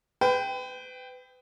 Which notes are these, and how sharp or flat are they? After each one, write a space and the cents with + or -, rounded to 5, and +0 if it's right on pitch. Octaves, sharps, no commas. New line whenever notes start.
B4 +35 G5 +0